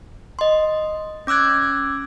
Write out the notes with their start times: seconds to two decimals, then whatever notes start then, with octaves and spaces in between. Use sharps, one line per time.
0.39 D#5 C6
1.27 C#4 D6 E6 F#6 G#6